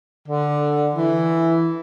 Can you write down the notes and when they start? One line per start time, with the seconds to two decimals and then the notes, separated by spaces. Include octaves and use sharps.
0.28 D3
0.95 E3